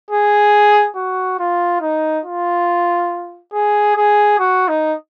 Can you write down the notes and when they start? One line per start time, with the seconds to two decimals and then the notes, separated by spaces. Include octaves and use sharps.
0.10 G#4
0.96 F#4
1.39 F4
1.81 D#4
2.25 F4
3.53 G#4
3.97 G#4
4.40 F#4
4.69 D#4